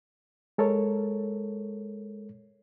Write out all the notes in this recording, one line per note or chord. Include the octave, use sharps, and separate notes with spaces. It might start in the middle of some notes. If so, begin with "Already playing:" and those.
G#3 A4 A#4 C#5